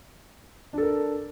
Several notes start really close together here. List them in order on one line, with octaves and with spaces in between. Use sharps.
D4 A4 A#4